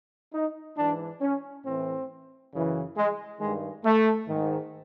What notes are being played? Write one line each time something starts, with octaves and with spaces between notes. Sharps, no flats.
D#4
G#2 E3 D4
C#4
A2 E3 C4
F#2 C#3 E3
G#3
G2 D#3 G#3
A3
G#2 D#3